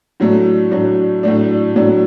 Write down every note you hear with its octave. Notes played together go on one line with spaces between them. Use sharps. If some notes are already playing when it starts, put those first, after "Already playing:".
A2 F#3 A3 D4
A2 F#3 A3 D4
A2 F#3 A3 D4
A2 F#3 A3 D4